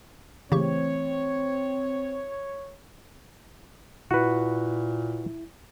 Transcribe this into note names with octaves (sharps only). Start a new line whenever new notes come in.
C#3 E3 A3 C4 G4 C#5 C#6
A#2 E4 F#4 B4